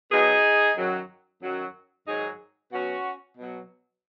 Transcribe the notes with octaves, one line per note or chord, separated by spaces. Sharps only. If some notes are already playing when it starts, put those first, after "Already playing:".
B2 F#3 D#4 G#4
F#2 D#3 F#3
F#2 D#3 F#3
G#2 D#3 F#3 D#4 G#4
B2 F#3 C#4 F#4
B2 F#3